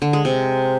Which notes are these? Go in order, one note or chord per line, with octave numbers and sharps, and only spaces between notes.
D3
G#3
C3